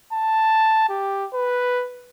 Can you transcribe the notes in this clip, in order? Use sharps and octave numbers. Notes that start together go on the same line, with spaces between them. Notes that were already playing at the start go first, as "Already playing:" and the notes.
A5
G4
B4